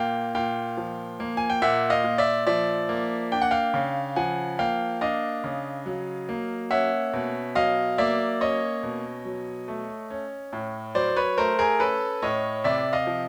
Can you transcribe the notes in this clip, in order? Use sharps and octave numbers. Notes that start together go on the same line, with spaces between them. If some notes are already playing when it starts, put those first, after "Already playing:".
Already playing: A#2 A#3 F5 G5
A#2 F5 G5
F3
A#3
G#5
G5
A#2 E5 F#5
D#5 F5
A#2
D5 E5
F3 D5 E5
A#3
D4 G5
F#5
F5 G5
C#3
F3 F#5 G#5
A#3 F5 G5
D4 D#5 F5
C#3
F#3
A#3
C#4 E5 F#5
B2
F#3 D#5 F5
A#3 D5 E5
C#4 C#5 D#5
B2
F#3
A3
C#4
A2
F#3 C5 D5
B4 C#5
A3 A#4 C5
G#4 A#4
C#4 A4 B4
A2 C#5 D#5
C3 D5 E5
D#5 F5
F3